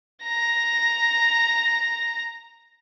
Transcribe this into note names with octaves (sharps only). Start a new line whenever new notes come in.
A#5 A#6